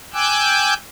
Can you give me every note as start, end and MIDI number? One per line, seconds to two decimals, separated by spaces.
0.13 0.74 79
0.13 0.74 80
0.13 0.74 86
0.13 0.74 88
0.13 0.74 90
0.13 0.74 91